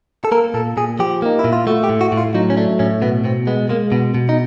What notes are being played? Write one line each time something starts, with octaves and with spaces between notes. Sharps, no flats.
A4
A#3 A#4
A#2 A4
A#2 G#4
F3 G4
A#3 D#4
E4
A#2
F4
A3 F#4
G4
A2
F#4
A2
F4
F#3 D#4
C#4
A3 D4
A2 C#4
B2 B3
B2 C4
G#3 B3
G#3 A#3
B2 B3
B2
D#4